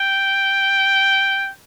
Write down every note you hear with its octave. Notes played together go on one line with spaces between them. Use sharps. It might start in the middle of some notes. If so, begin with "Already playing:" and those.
Already playing: G5